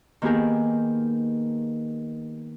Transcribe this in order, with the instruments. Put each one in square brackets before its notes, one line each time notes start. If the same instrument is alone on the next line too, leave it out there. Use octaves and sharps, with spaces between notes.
[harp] D#3 A#3 B3 G4 G#4 A#4